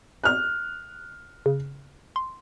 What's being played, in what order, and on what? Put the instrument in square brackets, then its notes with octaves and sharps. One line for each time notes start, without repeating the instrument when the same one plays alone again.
[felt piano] F6 F#6
[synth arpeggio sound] C#3
C6